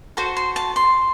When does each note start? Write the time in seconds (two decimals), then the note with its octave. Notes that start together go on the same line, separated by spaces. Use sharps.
0.17 F#4 A4 C5 C6
0.37 C6
0.56 A5
0.76 C6